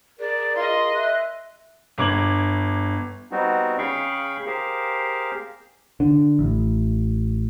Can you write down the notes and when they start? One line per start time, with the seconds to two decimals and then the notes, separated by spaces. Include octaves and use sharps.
0.19 G#4 A#4 D5
0.56 F4 D#5 C6
0.95 E5 F#6
1.98 G1 D6 G#6 F#7
3.31 G3 B3 C4 D#4 F#4
3.78 C#3 G#4 F5 G5 B5 C#6
4.46 G4 G#4 A#4 C5 F5
6.00 D3
6.39 A1